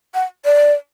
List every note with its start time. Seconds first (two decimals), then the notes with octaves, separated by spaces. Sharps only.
0.14 F#5
0.45 D5